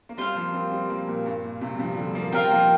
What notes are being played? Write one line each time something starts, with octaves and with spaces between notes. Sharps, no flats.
A#3
G3 C4 F4 C5 F5
F3 A#3
G3 C4
G3 C4
F3 A#3
A#2
G2
A#2
G2 C3
G3
C3 F3
F3
D3 G3
F3 A#3
G3 C4 F4 A#4 G5
F3 A#3